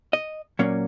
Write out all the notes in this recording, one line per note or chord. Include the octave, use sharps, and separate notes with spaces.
D#5
A#2 F#3 A#3 C#4